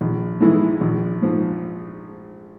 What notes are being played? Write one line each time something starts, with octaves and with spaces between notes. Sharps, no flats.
A#1
G#2 E3 G#3 E4
A#1
G#2 F3